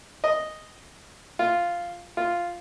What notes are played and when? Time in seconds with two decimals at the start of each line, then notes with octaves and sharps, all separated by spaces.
0.24 D#5
1.39 F4
2.17 F4